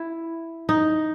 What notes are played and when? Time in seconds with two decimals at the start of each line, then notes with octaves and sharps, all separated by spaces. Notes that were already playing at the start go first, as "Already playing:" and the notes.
Already playing: E4
0.69 D#4